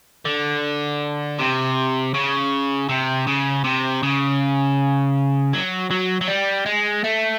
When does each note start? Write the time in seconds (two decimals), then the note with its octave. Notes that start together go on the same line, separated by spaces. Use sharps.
0.25 D3
1.39 C3
2.14 C#3
2.89 C3
3.27 C#3
3.64 C3
4.03 C#3
5.53 F#3
5.91 F#3
6.21 F#3
6.28 G3
6.66 G#3
7.04 A3